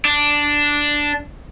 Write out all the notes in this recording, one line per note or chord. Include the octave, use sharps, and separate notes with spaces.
D4